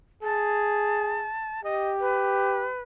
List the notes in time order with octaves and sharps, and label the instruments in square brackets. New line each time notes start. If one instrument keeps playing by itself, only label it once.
[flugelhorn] G#4 [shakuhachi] A5
[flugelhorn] G4 [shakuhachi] D#5
[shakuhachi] B4